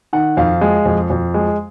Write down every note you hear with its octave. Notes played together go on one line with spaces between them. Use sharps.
D#3 F#5
F2 F5
G#3
F2
F2
G#3